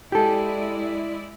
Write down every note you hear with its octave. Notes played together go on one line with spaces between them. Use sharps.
G#3 E4 G4 A4 D5